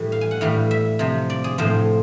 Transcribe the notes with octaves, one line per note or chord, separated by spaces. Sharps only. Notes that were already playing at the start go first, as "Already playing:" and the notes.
Already playing: A2 E3 G3
F5
G#5
F#5
A2 E3 G3 F5
E5
C3 F3
D5
G#4
A2 F3 C5